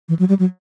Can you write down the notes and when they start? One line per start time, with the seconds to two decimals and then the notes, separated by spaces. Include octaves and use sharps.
0.09 E3
0.19 F#3
0.29 G3
0.39 F#3